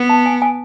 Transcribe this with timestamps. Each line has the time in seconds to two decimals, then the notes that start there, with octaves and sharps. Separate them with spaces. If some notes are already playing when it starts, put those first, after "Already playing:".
Already playing: B3
0.09 A5
0.26 G#5
0.42 G#5